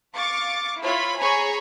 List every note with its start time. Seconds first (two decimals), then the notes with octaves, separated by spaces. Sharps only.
0.17 F5 C#6 D6 A6 C#7
0.81 E4 F4 C#5 B5
1.19 G#4 C#5 A#5 B5 C#6